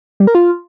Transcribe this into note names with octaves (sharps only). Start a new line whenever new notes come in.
G3
A#4
F4